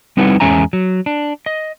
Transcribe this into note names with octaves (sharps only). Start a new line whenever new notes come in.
G3 C4 D#4 E4 B4 F#5
E2 G#3 C#4 E5 G#5 A#5
F#3
D4
D#5